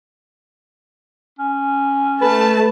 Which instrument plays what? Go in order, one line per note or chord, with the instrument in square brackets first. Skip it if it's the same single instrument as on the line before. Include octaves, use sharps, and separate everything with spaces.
[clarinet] C#4
[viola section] A3 A5 [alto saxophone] B4